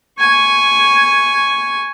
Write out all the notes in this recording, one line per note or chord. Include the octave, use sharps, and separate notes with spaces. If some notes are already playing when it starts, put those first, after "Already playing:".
G#5 C#6